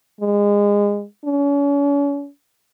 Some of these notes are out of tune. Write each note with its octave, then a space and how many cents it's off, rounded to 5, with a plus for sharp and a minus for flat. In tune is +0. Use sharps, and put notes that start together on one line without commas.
G#3 -25
C#4 +40